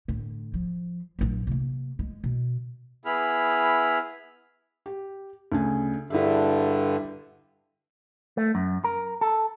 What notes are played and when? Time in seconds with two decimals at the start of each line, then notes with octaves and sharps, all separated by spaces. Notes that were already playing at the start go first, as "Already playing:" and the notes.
0.08 A2 D3
0.54 F3
1.19 A#1 F#3
1.47 C3 A#3
1.99 G#3
2.24 B2
3.05 B3 E4 G#4 B5 F6
4.86 G4
5.52 D2 C#3 G#5
6.10 G2 D3 E4 G#4 E5
8.37 A3
8.55 F#2
8.84 A#4
9.21 A4